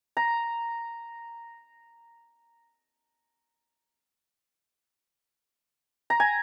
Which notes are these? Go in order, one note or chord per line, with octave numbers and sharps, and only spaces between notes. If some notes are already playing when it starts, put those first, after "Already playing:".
A#5
A#5
G#5